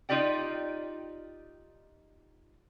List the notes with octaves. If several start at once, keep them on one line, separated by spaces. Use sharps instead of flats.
D#4 F4 G4 D5 G5